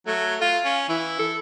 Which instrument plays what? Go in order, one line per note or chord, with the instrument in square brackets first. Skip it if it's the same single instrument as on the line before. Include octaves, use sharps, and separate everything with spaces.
[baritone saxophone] F#3 [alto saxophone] A3
[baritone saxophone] F4 [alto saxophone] F5
[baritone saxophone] C#4
[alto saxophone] E3 [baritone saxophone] E4
[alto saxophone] A4